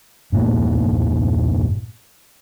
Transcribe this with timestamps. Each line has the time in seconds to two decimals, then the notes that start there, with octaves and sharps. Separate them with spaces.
0.32 E1 G2 A#2 A#3